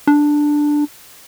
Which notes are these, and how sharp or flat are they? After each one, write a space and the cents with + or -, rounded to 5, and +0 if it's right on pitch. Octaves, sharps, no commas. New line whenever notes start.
D4 +5